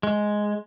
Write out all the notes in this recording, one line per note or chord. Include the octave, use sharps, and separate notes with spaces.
G#3